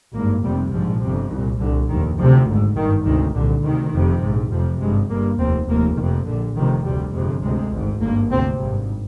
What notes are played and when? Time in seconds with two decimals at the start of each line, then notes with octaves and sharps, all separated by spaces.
0.13 G#1 G2 A#3
0.43 F1 F2 C3 G3
0.72 A#1 G#2 F3
1.01 G1 F2 C3
1.31 C2 A#2 D#3
1.59 C2 A#2 D3
1.89 F1 D#2 D#3
2.18 D2 C3 F3
2.46 G#1 G#2
2.76 G#1 G2 D#3
3.05 D2 C3 D#3
3.34 C2 A#2 D3
3.64 D2 C3 D#3
3.93 F1 F2 C3
4.22 A#1 G#2
4.51 F1 F2 C3 F3
4.80 G#1 G2 G#3
5.09 G1 G2 A#3
5.38 F1 D#2 C4
5.68 F1 D#2 A#3
5.97 F1 F2 C3 D#3
6.26 A#1 A#2 D3
6.55 F1 F2 C3 D#3
6.85 D2 C3 G3
7.13 G1 F2 C3 G#3
7.42 D2 C3 G#3
7.73 G#1 G#2
8.01 G#1 G2 A#3
8.30 D2 C3 C4
8.60 G#1 G2